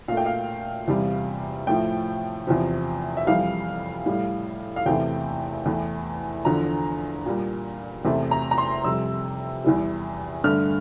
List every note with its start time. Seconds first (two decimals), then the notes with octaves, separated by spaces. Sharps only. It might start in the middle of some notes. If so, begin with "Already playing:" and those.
0.08 A#2 A3 F5
0.17 G5
0.26 F5
0.88 E2 C3 G3
1.67 A2 F3 A3 G5
2.47 E2 C3 F3
3.17 E5
3.27 F2 E3 G3 F5
4.06 A2 G3
4.76 F5
4.86 E2 C3 E3 A3 G5
5.66 E2 E3 A3
6.45 E2 D3 F3 A#5
7.26 A#2 G3
8.05 E2 C3 E3 A3
8.31 A#5
8.51 A#5
8.58 C6
8.84 F2 C3 G3 E6
9.64 E2 E3 G3
10.44 G2 D3 A3 F6